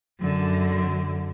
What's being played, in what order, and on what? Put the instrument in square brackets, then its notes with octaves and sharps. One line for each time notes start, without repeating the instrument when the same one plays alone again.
[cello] F#2 D3